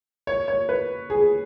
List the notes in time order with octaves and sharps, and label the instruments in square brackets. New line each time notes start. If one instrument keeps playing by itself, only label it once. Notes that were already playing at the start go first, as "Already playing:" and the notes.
[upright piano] C#5
C#5
B4
G#4